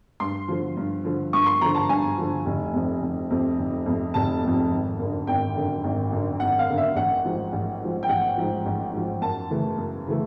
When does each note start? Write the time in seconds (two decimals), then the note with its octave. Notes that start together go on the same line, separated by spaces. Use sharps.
0.20 G2 C6
0.48 D3 F3
0.77 G2
1.05 D3 F3
1.33 G2 C#6
1.46 C6
1.61 D3 F3 A#5
1.75 A5
1.89 G2 G#5
2.18 D3 F3
2.46 F1
2.73 F2 C3
3.02 F1
3.30 F2 C3
3.59 F1
3.86 F2 C3
4.14 F1 A5
4.43 F2 C3
4.71 G#1
4.99 F#2 D3
5.27 G#1 G5
5.56 F#2 D3
5.84 G#1
6.12 F#2 D3
6.40 G#1 F#5
6.59 F5
6.68 F#2 D3
6.78 E5
6.96 A1 F#5
7.24 G#2 F3
7.53 A1
7.81 G#2 F3
8.03 G5
8.09 A1 F#5
8.37 G#2 F3
8.66 A1
8.93 G#2 F3
9.22 F#2 A5
9.50 C#3 E3 A3
9.78 F#2
10.06 C#3 E3 A3